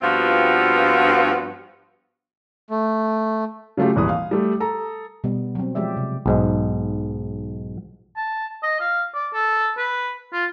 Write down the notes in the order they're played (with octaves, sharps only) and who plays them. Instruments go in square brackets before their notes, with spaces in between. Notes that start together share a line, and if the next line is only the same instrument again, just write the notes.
[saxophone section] G2 F3 B3 C4 F4 F#4
[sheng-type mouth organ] A3
[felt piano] C#3 F#3 A3 F4 G4
D#1 G#1 E3 D#6
F5
G3 A3
A4 A#5
[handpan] B2 G3 B3
F#3 C4
F3 G#3 G4 D5 E5
C3
[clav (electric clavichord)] B1 G#2 G#3
[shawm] A5
D#5
F5
D5
A4
B4
F4